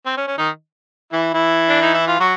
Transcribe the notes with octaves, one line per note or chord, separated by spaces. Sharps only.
C4
C#4
C#4
D#3 D#4
E3 E4
E3 E4
D4
D#4
E4
F4
F#3 F#4